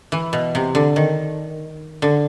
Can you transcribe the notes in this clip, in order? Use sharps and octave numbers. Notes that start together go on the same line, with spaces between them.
E3
B2
C3
D3
D#3
D3